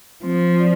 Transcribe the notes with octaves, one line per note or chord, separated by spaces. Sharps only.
F3 C4
D5